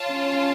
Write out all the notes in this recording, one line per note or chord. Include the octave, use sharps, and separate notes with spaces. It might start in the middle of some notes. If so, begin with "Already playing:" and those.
Already playing: F4 C#5 F5 A5
C#4